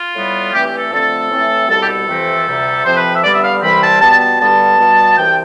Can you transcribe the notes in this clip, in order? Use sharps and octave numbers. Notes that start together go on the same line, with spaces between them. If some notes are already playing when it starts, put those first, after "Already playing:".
Already playing: F4
A2 G3 B3
G2 E3 A3 C4 G4
G4
A4
F2 D3 A3 C4 A4
A2 E3 A3 C4
C2 B2 G3 A4
G4
A4
F2 C3 E3 A3 C4
D2 C3 G3
F2 C3 F3 C4 C5
B4
E5
G2 D3 G3 B3 D5
E5
F5
C2 C3 E3 G3 C4 B5
A5
B2 G3 B3 A5
A5
G2 D3 G3 B3 A5
B2 G3 B3
C2 C3 E3 G5